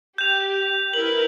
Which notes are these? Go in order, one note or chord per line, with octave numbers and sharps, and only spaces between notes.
G4 G6 F7
E4 A#4 B4 F#7